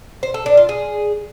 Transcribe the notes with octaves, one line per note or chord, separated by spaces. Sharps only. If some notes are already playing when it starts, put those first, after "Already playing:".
C5
A4
D4
F4
G#4